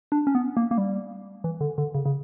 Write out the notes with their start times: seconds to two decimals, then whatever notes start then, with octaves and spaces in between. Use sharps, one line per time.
0.12 D4
0.27 C#4
0.35 B3
0.57 A#3
0.71 A#3
0.78 G3
1.44 E3
1.61 D3
1.78 D3
1.95 C#3
2.05 C#3